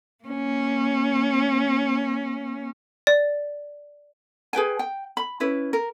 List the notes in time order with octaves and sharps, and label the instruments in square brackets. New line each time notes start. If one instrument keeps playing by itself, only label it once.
[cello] A#3 C#4
[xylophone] D5
[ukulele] G#4 B4 G5 G#5
G5
B5
C#4 E4 B4
A#4